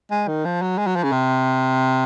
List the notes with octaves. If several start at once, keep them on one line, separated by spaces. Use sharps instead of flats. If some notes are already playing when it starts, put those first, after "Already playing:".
G#3
D#3
F3
F#3
G#3
F#3
F3
C#3
C3